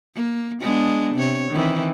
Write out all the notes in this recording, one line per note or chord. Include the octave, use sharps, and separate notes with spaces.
A#3
G#3 B3 D4
C3 C#5
D#3 E3 C4